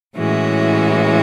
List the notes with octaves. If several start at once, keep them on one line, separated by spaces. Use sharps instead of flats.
A2 E3 G#3 C#4 F#4